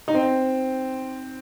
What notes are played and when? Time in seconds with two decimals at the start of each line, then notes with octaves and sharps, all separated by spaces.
0.08 D#4
0.15 C4